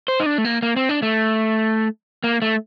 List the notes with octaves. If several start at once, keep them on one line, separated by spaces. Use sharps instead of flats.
C5
D#4
D4
A3
A#3
A#3
C4
D4
A3
A#3
A3